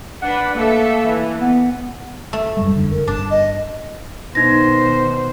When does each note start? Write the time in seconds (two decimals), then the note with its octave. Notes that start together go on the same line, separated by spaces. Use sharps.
0.22 D4 B4 F#5
0.54 A3 A#3 A4 E5
1.05 E3
1.40 B3
2.33 A3
2.57 F#2 G3 G#3
2.76 F1 D3
2.91 A#4
3.08 G1 D4 A5
3.30 D#5
4.35 B2 D#3 D#4 C5 A#6